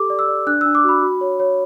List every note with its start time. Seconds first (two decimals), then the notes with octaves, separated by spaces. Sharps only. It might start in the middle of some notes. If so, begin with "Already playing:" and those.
Already playing: G4 A4 D6
0.10 D5
0.19 E6
0.28 D5
0.47 D4 F#6
0.61 D4 E6
0.75 D6
0.84 F#4 B5
1.02 F#4
1.21 C#5
1.40 C#5